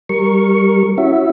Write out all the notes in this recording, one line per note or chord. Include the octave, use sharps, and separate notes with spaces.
G3 A#4 C#6
C#4 E4 F#4 E5